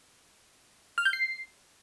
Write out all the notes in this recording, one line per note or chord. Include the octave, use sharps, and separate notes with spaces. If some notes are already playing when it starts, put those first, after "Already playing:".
F6
G6
C7